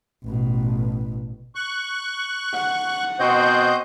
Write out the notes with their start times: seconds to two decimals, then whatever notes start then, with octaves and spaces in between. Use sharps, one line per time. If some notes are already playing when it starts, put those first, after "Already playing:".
0.25 A1 B2
1.55 C#6 F#6
2.54 F#5
3.19 B2 C4 F#4 C5 D#5 G6